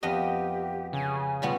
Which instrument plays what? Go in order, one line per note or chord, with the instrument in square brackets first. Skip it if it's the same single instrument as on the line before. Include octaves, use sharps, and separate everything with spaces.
[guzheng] F2 B3 D#5 [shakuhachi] G4
[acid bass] C#3 [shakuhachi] G#5
[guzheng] B2 G3 B3 [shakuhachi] F4